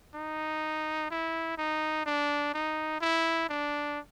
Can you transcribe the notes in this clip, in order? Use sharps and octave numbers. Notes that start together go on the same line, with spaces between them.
D#4
E4
D#4
D4
D#4
E4
D4